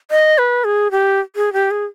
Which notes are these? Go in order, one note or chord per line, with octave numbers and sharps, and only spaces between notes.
D#5
B4
G#4
G4
G#4
G4
G#4